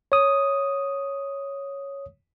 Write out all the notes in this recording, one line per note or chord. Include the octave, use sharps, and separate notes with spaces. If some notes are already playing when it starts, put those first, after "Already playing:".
C#5 D#6